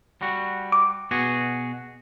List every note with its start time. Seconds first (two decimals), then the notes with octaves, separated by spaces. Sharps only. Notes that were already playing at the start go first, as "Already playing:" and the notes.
0.21 G3 F#4
0.72 D6
1.11 B2 F#4 G#4